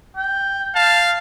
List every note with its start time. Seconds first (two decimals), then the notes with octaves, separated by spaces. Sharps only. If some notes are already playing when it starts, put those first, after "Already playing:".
0.17 G5
0.75 F5 A5